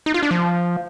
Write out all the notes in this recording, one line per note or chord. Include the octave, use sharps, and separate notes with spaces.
D#4
F4
D4
F3